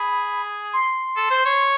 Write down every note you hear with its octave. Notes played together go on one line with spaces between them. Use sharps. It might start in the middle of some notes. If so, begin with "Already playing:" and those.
Already playing: G#4 B5
C6
A4
C5
C#5